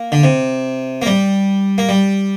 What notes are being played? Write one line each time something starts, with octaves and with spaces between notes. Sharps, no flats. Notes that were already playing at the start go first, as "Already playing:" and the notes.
Already playing: A#3
D3
C3
A#3
G3
A#3
G3